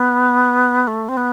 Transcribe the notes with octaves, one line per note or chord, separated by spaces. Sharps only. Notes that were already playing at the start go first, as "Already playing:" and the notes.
Already playing: B3
A3
C4
B3